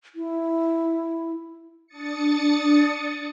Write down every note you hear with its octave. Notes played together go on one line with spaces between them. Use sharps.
E4
D4 D#6 A6 C#7